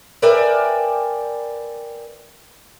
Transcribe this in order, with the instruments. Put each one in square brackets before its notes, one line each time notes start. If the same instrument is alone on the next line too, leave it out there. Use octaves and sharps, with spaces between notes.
[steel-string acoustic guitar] A#4 B4 D5 E5 G5 G#5